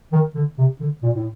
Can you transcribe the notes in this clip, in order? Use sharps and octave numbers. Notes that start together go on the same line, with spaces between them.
D#3
D3
C3
D3
A#2
A2